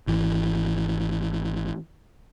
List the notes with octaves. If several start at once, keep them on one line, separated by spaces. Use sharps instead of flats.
G#1 E3